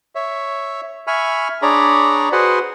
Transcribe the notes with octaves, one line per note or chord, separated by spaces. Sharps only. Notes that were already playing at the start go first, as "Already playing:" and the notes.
C#5 E5
E5 G#5 B5 C#6 F6
D4 G#4 C#5 D5 A#5 B5
F#4 G#4 B4 C5 F#5